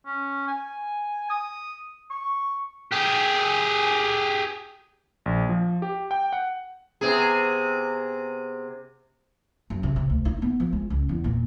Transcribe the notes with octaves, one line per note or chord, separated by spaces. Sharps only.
C#4
G#5
D#6
C#6
G4 G#4
A#1
F3
G4
G5
F#5
C3 B3 G#4
F#2
C3
C3
D2
D#4
B3
F3
G#3
C#2
E2
A#2